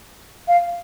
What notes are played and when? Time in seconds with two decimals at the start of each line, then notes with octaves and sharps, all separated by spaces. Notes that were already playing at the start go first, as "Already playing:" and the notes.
0.48 F5